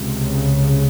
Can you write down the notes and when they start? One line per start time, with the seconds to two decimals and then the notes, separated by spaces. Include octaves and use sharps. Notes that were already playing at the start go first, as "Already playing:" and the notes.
Already playing: C#2 C3
0.23 C#3